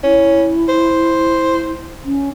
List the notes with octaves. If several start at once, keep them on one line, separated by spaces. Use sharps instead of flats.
C#4 E4
C5
C#4